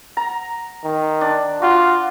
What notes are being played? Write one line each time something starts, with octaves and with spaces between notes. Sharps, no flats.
A#5
D#3
D4
F4 F#4